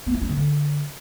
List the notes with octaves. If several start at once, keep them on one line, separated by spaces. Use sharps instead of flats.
B3
E4
C#4
D#3
D3